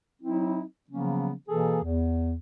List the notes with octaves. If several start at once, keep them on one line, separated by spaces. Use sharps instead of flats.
F#3 C4 D#4 E4
C#3 F3 F#3 A#3 B3 C#4
B2 E3 A#3 G#4 A4
E2